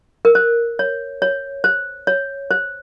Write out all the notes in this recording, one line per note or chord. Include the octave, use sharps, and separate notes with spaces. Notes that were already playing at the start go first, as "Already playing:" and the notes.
A#4
C5
C#5
C#5
C5
C#5
C5